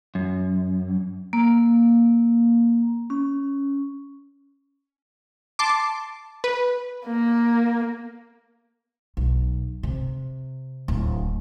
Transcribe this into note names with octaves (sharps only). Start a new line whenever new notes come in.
F#2
A#3
C#4
A5 C6 D6
B4
A#3
B1
C3
D1